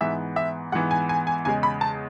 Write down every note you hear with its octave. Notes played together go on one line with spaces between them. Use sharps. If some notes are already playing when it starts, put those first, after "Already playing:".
G#2 E3 B3 E5
E5
G#2 E3 B3 F#5
G#5
G#5
G#5
E2 C#3 G#3 G#5
B5
A5